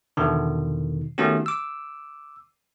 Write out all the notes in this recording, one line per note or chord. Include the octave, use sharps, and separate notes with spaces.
E2 B2 D3 D#3
D#3 A3 B3 C#4 F#4 G4
D6 E6